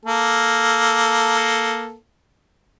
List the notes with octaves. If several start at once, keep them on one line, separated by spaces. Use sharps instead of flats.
A#3 A4